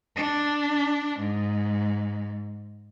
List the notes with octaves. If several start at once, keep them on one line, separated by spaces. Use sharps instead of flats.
D4
G#2